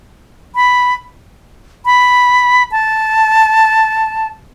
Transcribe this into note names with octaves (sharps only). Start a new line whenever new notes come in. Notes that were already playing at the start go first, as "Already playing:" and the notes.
B5
B5
A5